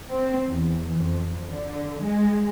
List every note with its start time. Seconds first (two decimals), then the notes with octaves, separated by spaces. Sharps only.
0.10 C4
0.47 E2
0.97 F2
1.49 D3
2.01 G#3